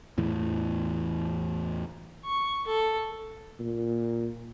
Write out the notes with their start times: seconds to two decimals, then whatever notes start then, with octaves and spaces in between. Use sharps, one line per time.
0.18 E2 A2 E3
2.26 C#6
2.67 A4
3.60 A#2